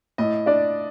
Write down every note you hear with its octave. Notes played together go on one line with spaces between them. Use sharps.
A2 D#5
D4 D5